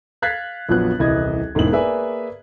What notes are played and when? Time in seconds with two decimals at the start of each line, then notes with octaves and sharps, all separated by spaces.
0.22 F5 F#6 G#6 A6 B6 C7
0.69 A#1 F2 F3 F#3 B3 F#6
0.99 D#1 C2 E3 D#5 G#6
1.55 E1 G#2 A#3 D#4 E4 F#7
1.72 A#3 G#4 B4 D5 E5 G#5